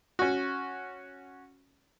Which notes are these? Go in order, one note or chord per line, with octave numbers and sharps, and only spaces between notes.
C#4 F#4